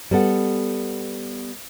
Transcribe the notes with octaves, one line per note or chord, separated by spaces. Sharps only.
G3 B3 A4 F#5